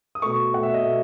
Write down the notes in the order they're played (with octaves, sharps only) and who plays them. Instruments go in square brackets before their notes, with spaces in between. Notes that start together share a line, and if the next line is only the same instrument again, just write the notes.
[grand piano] D#6
B2 A3 C#6
B2 A3 F#5
E5
D#5
B2 A3 E5